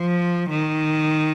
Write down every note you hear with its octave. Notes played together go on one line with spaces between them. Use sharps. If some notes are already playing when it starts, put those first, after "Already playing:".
Already playing: F3
D#3